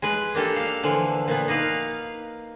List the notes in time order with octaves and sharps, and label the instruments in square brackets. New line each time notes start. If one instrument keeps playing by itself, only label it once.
[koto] G#3 B4
A#3 D4 G4 A4
F5
D3 E3 F3
A#2 B3
A#3 D#4 B4 F5